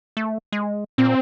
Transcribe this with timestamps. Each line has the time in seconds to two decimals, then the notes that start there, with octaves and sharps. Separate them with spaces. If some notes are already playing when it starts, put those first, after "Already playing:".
0.17 A3
0.52 G#3
0.98 A#2 C4